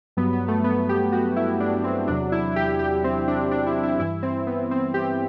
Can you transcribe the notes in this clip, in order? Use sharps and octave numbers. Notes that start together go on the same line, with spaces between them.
G2 F#3 B3
B3
A3
B3
G4
F#4
E4
D4
C4
E2 C3 F#3 D4
E4
G4
G4
C4
D4
D4
E4
E4
G2 E3 E4
C4
B3
C4
G4